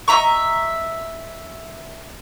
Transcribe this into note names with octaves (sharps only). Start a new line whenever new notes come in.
D#5 E5 A#5 C#6